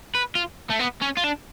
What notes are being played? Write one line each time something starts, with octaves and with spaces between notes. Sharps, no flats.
B4
F4
A3
B3
C#4
F4
D4